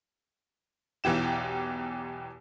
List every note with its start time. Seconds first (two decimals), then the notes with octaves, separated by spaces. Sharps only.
1.04 B1 E2 E3 G4 E7